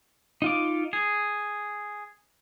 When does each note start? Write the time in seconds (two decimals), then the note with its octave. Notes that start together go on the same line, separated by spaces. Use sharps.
0.42 D#4 F4 D6
0.93 G#4